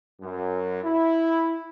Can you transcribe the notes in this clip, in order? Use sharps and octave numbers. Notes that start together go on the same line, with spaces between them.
F#2
E4